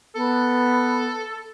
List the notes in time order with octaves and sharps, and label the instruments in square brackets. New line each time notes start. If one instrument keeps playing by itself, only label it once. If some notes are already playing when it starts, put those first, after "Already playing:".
[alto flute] B3 [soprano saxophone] A4